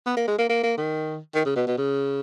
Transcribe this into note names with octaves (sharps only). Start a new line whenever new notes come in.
B3
A#3
G#3
A#3
A#3
A#3
D#3
D#3
C#3
B2
B2
C#3